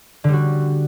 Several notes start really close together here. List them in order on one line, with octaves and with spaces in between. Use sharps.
D3 G3 F#4